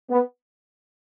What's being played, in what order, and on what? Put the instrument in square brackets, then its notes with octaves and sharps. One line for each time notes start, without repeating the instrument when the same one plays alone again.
[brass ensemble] B3